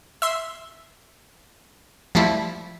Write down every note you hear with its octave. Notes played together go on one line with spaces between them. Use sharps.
E5 C6
F3 G3 A3 E4